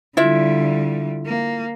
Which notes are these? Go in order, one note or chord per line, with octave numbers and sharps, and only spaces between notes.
D3 G3 E4 F4 E5
A#3